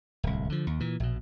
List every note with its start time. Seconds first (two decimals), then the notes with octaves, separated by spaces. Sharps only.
0.23 D1 C2
0.50 D3 F3
0.67 D#2
0.80 A#2 E3
1.00 A#1 B2